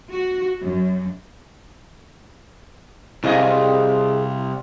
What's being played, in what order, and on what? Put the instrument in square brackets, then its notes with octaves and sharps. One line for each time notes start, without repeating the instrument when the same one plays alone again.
[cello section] F#4
F#2
[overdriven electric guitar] C2 [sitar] C4 G#4 D#5 [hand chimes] E4 F5